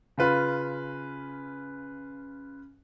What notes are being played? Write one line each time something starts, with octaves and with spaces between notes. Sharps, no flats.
C#3 F4 B4